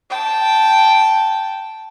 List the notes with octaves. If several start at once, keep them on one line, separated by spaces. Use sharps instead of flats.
G5 A5